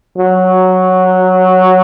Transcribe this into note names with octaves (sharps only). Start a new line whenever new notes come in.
F#3